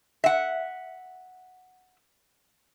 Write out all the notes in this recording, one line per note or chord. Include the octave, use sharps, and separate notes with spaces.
E5 F#5